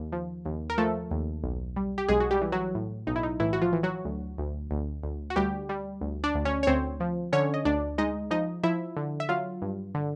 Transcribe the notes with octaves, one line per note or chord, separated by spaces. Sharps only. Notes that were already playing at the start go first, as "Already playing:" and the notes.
Already playing: D#2
F3
D#2
A#4
F3 A3 A4
D#2
B1
G3
G4
B1 G#3 G#4
F#4
G3 G4
E3
F#3 F#4
A2
B1 D#4
E4
D#4
A2 E3 E4
F#4
F3 F4
E3
F#3 F#4
D2
D2
D2
D2
F#4
D2 G3 G4
G3
D2
D4 D5
D2
C#4 C#5
C#5
D2 C4 C5
F3
D3 C#4 C#5
D#5
D2 D4 D5
G#3 D#4 D#5
F3 D#4 D#5
F3 E4 E5
D3
E5
F#3 F4 F5
G2
D3